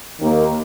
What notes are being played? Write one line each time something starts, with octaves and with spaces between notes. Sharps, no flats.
D#2 D#3 A#3